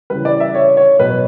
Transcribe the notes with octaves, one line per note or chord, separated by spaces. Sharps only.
C#3 E3 G3 B4
D5
E5
C#5
C#5
B2 F#3 B4